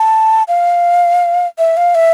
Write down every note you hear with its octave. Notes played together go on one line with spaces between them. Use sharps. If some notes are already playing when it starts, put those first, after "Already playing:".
Already playing: A5
F5
E5
F5
E5